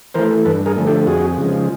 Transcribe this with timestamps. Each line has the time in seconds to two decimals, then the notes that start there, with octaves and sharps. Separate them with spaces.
0.14 E3 A3 A#4 C5
0.45 G2 A4 B4
0.66 G#4 A#4
0.76 D3 F3 A3
0.86 G4 A4
1.07 F2 F#4 G#4
1.38 C#3 F3 G#3